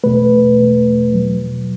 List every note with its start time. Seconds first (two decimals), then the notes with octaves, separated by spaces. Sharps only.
0.04 E2 B2 A3 B4
0.58 E2 B2 A3
1.11 E2 B2 F#3